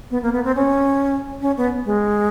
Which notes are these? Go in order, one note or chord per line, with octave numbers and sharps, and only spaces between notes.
B3
A#3
B3
C4
C#4
C#4
B3
G#3